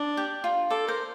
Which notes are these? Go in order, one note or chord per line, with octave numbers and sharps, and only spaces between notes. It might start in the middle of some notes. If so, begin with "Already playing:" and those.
Already playing: D4
G4
F4
A4 D5
A#4 C5